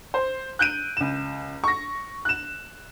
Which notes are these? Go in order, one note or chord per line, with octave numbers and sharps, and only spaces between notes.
C5
F#6 G6 D7 D#7
C#2 E7
C#6 A#6
F#6 E7